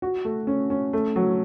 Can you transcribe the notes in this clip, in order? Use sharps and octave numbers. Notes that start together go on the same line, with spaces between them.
F#4
A3
C#4
C#4
A3
F#3